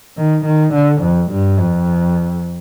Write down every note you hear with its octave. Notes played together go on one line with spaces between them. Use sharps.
D#3
D#3
D3
F2
G2
F2